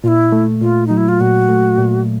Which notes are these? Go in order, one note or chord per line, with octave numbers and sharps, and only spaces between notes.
A#2 E4 F4
A3
A#2 F4
F#3 D#4
E4
F4
A#2 F#4
A3
A#2